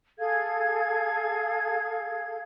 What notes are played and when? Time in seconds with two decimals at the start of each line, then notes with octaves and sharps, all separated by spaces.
0.19 G#4 A4 F5 G#6